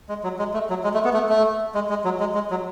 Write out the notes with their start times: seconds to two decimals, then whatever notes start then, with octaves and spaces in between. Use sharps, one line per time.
0.09 G#3
0.24 F#3
0.39 G#3
0.54 A3
0.69 F#3
0.84 G#3
0.94 A3
1.04 B3
1.14 A3
1.29 A3
1.75 G#3
1.90 G#3
2.05 F#3
2.20 G#3
2.34 G#3
2.51 F#3